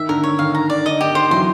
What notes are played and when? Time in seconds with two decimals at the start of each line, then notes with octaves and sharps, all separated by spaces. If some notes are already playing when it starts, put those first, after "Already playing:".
Already playing: D#3 E5
0.09 D3 A#4
0.23 C#5
0.39 D#3 F5
0.55 A#5
0.70 D5
0.86 D3 D#5
1.00 D#3 G4
1.15 C5
1.31 E3 F#3 C6